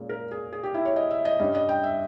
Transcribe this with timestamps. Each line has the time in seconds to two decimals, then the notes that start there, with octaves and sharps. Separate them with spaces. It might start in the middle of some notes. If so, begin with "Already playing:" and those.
Already playing: A#2 G#3 C#4
0.09 A#4
0.31 G#4
0.53 G#4
0.63 G4
0.74 E4
0.85 C#5
0.96 D#5
1.11 E5
1.25 D#5
1.39 G2 G3 C#4 D#5
1.55 D#5
1.69 G5
1.84 E5